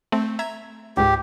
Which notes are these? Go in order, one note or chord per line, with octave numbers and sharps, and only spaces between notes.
A3 C4
E5 A#5 G#6
C#2 G#2 G4